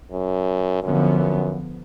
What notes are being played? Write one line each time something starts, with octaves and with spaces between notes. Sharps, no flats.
F#2
F#2 D3 F3 B3
F#2